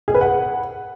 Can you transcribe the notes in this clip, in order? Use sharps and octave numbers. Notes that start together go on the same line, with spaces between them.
G#4
B4
F#5